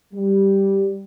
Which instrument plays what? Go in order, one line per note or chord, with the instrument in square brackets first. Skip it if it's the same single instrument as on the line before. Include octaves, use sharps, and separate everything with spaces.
[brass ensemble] G3